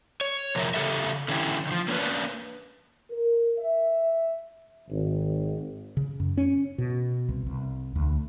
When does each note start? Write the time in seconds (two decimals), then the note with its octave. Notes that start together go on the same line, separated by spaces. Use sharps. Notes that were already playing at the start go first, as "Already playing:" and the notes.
0.21 C#5
0.55 F2 C3 F3 A#4 E5
0.74 C#3 G#3 G4 A4 E5
1.28 D3 E3 C#4 E4 G4
1.67 D#3 F3
1.88 A#3 C#4 D4 B4
3.11 A#4
3.59 E5
4.89 G#1
5.97 C#3
6.20 F#2
6.37 C#4
6.78 B2
7.28 C2
7.46 C2
7.96 D2